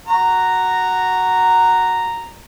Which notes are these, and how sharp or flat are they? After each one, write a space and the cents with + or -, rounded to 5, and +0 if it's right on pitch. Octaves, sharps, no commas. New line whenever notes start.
F#4 +5 A#5 -5